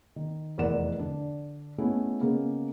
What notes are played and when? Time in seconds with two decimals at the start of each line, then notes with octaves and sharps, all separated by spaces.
0.16 D#3
0.58 F1 E2 A#4 D5 F#5 E7
0.99 D3 D4
1.78 G#3 A3 B3 C#4 E4
2.20 C#3 G#3 A#3 B3